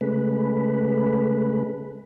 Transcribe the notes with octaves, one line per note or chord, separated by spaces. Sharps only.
C#3 G#3 A3 B4